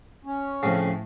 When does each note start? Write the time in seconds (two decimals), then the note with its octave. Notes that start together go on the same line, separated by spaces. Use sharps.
0.25 C#4
0.63 F2 A2 C#3